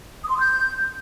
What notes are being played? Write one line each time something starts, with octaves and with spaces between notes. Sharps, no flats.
D#6
C6
D#6
G6